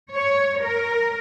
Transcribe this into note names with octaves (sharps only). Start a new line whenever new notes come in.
C#5
A#4